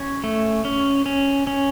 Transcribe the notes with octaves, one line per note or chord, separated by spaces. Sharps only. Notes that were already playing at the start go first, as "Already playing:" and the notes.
Already playing: C#4 C#5
A3
C#4
C#4
C#4